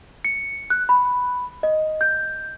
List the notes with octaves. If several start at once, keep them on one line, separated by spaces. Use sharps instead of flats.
C#7
F#6
B5
D#5
G6